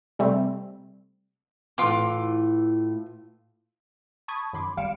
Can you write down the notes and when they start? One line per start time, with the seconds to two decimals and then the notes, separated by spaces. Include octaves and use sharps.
0.19 C3 G3 A3 C4
1.78 A2 E3 F4 D6
4.28 A5 B5 C#6 D#6 G#6
4.53 F#2 D#3 B5 C6 D6
4.77 G#1 G3 F5 C#7 D7 E7